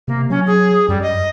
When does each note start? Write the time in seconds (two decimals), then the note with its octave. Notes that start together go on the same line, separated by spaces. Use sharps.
0.08 C3 A#3
0.30 F#3 C#4
0.46 G#4
0.89 F#2 G3
1.02 D#5